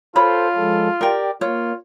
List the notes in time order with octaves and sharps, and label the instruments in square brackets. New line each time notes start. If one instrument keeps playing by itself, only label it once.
[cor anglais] F4 [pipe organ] A4 C5 [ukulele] C#5 B5
[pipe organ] F3 G#3 A4
[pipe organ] G4 D5 [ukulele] A#4 G5
[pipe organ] A#3 [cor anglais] F4 [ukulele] C#5